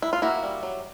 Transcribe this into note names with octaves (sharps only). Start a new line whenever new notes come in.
E4
F4
A#3 E4 F#4
G3
F#3